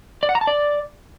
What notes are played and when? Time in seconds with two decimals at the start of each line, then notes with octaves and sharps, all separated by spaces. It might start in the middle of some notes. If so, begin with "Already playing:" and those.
0.23 D5
0.29 F#5
0.35 A#5
0.41 A5
0.47 D5